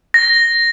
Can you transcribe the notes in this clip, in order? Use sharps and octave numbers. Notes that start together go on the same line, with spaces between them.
A#6